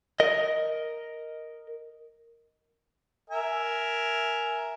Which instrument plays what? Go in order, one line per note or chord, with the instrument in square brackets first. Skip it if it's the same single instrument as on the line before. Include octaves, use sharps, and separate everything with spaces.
[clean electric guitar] A#4 D#5
[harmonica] A#4 E5 G#5